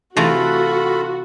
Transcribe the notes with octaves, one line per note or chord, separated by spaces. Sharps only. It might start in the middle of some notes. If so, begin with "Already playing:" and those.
C3 E3 A3 F4 F#4 A4 B5